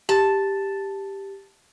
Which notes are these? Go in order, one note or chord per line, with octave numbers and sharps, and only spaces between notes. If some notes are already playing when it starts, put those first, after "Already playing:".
G4 A5